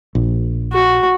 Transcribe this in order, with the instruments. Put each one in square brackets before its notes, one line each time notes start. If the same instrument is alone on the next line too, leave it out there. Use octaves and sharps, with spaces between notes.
[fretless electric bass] A#1
[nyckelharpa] F#4